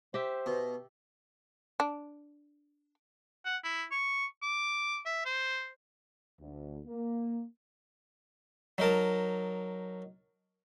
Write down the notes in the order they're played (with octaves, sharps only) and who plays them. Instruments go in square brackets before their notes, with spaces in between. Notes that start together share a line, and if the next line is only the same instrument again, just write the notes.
[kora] G4 E5 [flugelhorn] C5
[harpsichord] B2
[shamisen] D4
[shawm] F#5
E4
C#6
D6
E5
C5
[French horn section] D2
A#3
[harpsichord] F#3 D#4 A#4 A5